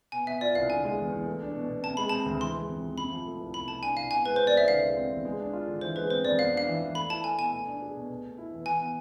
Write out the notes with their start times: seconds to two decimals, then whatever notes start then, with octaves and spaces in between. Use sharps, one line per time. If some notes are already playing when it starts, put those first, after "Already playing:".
0.12 B2 G#5
0.26 B3 E5
0.41 F4 D5
0.55 C2 F5
0.70 D3 G#5
0.84 G#3
0.98 E2
1.12 E2
1.27 A3
1.41 D4
1.55 B2
1.70 B2
1.83 C3 A5
1.97 G#3 B5
2.09 C4 A5
2.26 D2
2.41 E3 C6
2.54 G#3
2.69 F2
2.83 F2
2.97 C3 B5
3.12 F3
3.26 A3
3.40 C2
3.54 B2 B5
3.68 A3 A5
3.82 D4 G#5
3.97 C2 F5
4.11 B2 G#5
4.26 G#3 B4
4.36 B3 C5
4.47 D5
4.54 C2 E5
4.68 D3 F5
4.82 G#3
4.97 C4
5.11 E2
5.25 G#3
5.40 D4
5.53 F4
5.67 D3
5.81 E3 C5
5.96 G#3 B4
6.10 C4 C5
6.25 F2 D5
6.39 B3 F5
6.53 D4 F5
6.67 E3
6.82 E3
6.95 A3 B5
7.10 E4 A5
7.24 A4 G#5
7.38 B2 G#5
7.53 A3
7.67 D4
7.82 G#4
7.96 B2
8.10 B2
8.24 A3
8.38 E4
8.52 E2
8.66 E3 G#5
8.80 B3